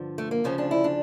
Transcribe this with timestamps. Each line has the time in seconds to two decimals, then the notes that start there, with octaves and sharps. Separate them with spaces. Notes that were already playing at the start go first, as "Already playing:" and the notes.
Already playing: G2 D3 F3
0.18 A3
0.31 A#3
0.44 D2 C#3 F3 C#4
0.58 D4
0.71 E4
0.84 D4